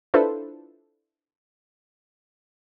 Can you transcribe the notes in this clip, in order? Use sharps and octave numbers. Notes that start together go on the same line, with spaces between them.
D4 E4 F4 A4 B4 C5